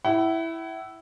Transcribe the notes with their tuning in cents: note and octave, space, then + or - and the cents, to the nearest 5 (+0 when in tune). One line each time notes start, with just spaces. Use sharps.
E4 +0 F#5 +40